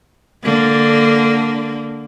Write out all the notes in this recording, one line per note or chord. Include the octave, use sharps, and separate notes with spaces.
D3 A#3